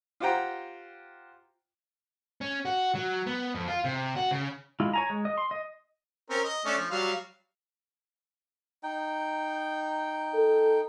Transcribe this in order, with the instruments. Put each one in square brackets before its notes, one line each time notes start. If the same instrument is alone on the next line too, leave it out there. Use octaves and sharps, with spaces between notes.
[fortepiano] F4 G4 C5 F#5 G5 A#5
[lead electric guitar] C#4
F#4
F#3
B3
F2
F4
C3
F#4
C#3
[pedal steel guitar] G#3 E4 F4
C#5 G#5 A#5
G#3
D#5
C6
D#5
[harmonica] C4 C#4 A#4
D#5
A3 C#4 D4
F3
F#3 G3 F5
[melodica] D#4 G5
[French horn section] A4